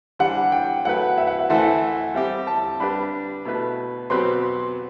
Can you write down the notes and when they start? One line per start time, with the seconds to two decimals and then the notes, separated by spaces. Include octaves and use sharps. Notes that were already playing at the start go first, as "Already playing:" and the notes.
0.19 E3 G3 D4 G4 C5 F#5
0.52 G5
0.85 F#3 A3 E4 B4 F#5
1.18 E5
1.27 F#5
1.39 E5
1.49 E3 A3 E4 A4 C5 E5
1.58 F#5
1.67 E5
2.14 G3 C4 G4 E5
2.47 A5
2.80 G3 D4 G4 B4 B5
3.45 B2 A3 E4 B4
4.10 B2 F#3 C4 G4 B4 C6